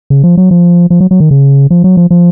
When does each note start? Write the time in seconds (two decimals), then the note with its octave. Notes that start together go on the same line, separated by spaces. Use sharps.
0.10 C#3
0.23 F3
0.37 F#3
0.51 F3
0.90 F3
1.01 F#3
1.11 F#3
1.20 D#3
1.31 C#3
1.71 F3
1.84 F#3
1.97 F3
2.11 F3